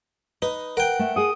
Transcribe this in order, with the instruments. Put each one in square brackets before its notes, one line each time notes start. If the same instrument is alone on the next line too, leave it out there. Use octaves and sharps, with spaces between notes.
[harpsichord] D#4 [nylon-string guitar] B4
[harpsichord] A#4 G5 [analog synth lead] F#5
[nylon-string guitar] A3
[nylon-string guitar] G#4 F#5 [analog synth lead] D#6